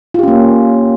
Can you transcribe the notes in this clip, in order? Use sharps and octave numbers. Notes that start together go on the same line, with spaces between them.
A#3 C#4 F4 G4